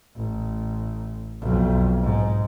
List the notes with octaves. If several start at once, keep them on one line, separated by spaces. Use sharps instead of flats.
A1
B1 F2
G#2